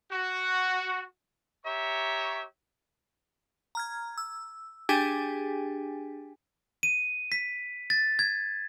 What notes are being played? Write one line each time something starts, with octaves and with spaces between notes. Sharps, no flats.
F#4
G4 C#5 E5 A#5 C#6
A#5 F6 G#6
E6
D4 G4 G#4 G5 G#5 B6
D#7
B6
A6
G#6